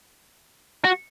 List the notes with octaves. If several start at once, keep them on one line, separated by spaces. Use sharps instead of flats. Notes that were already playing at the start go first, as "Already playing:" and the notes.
F#4